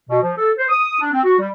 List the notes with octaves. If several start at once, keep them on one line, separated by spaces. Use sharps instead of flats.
B2
F3
A4
C5
D#6
D4
C4
F#4
G3